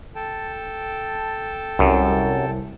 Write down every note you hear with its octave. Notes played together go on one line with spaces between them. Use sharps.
A4 G5 A5
C2 F#2